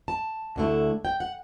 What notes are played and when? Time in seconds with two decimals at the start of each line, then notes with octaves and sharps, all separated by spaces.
0.08 A5
0.56 D2 D3 A3 E4
1.05 G5
1.20 F#5